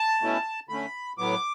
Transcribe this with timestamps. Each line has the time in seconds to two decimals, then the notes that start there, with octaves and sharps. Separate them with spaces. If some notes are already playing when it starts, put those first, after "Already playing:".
Already playing: A5
0.21 B2 A3 C#4 E4
0.69 D3 A3 C#4 B5
1.18 A2 F#3 B3 D6